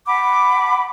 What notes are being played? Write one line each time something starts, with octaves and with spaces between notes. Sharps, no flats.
F#5 A5 B5 D6